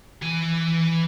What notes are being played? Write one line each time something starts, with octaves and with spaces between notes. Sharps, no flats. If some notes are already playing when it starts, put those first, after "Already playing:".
E3 G#5